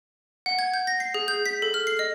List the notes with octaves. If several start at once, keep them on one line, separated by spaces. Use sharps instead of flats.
F#5
G#6
G6
A#6
C7
G#4
G6
B6
A4
F6
C7
D#5